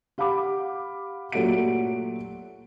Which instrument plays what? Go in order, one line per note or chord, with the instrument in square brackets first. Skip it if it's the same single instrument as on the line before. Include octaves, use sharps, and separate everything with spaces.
[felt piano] G4 F5 F#5 B5 D6
A#2 F#3 A3 G4 F#5 D7